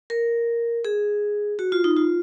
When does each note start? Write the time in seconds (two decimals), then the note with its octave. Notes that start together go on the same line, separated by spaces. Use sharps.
0.10 A#4
0.85 G#4
1.59 F#4
1.72 F4
1.84 D#4
1.97 F4